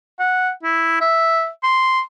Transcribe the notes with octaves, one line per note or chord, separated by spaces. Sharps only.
F#5
E4
E5
C6